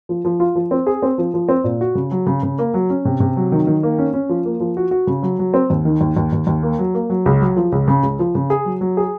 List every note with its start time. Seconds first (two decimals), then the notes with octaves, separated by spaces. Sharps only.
0.09 F3
0.25 F3
0.40 F4
0.55 F3
0.71 C4
0.87 G#4
1.02 C4
1.18 F3
1.34 F3
1.49 C4
1.64 A#2
1.81 F#4
1.95 C#3
2.11 F#3
2.27 C#3
2.43 C#3
2.58 A#3
2.74 F#3
2.90 C#4
3.05 C3
3.20 C3
3.37 F#3
3.52 D#3
3.67 D#3
3.83 A#3
3.99 C#4
4.14 C#4
4.29 F3
4.45 A#3
4.60 F3
4.77 F#4
4.91 F#4
5.07 C#3
5.23 F#3
5.39 F#3
5.54 C4
5.70 D#2
5.85 D#3
6.01 D#2
6.17 D#2
6.33 D#2
6.47 D#2
6.63 A#3
6.79 F#3
6.94 A#3
7.10 F#3
7.26 C#2
7.41 F#3
7.56 F3
7.72 C#2
7.88 C#3
8.03 C#2
8.19 F3
8.35 C#3
8.50 G#4
8.65 F#3
8.81 F#3
8.97 G#4